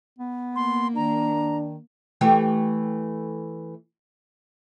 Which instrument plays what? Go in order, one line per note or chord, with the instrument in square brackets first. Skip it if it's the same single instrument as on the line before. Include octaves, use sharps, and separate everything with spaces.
[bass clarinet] B3
[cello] A#3 [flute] C6
[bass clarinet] D#3 [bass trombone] D4 [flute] A#5
[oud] E3 A3 G4